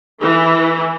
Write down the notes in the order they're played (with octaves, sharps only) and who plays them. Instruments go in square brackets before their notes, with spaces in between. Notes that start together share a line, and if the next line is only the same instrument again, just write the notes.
[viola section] E3